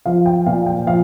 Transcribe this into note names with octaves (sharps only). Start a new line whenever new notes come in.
F3 F5
G5
A#2 F5
G5
F3 F5